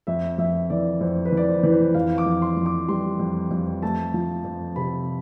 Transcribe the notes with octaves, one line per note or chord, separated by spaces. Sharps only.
F2 E5
F2 E5
E3 D5
F2 C5
B4
E3 D5
C5
E3
C5
F2 F5
D6
F2
C6
F2
D6
G3 C6
F2
F2
A3 A5
F3
F2
C3 B5